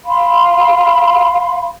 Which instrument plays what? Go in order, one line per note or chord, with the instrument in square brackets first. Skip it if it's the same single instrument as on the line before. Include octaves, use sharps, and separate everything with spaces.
[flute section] F5 B5 C6